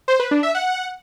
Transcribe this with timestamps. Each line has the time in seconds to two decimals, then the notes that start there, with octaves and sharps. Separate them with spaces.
0.08 C5
0.20 B4
0.31 D4
0.43 E5
0.55 F#5